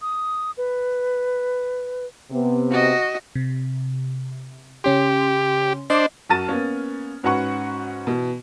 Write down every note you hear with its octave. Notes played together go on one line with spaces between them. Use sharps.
D#6
B4
C3 B3
F#4 D#5
C3
C#3 C#4 G4 C6
D4 C5 D#5 D6
F#2 F#4 A5 F6 A6 D#7
A#3 B3 C#4
G#2 C#4 F#4 B4 F#5 C#6
B2 E3